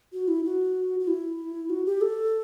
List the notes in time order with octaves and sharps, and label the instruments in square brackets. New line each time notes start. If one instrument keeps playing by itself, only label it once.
[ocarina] F#4
E4
F#4
F#4
E4
F#4
G4
A4